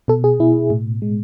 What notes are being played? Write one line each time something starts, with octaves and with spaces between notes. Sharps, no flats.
B2 A4
G#4
B2 E4
A2
G#3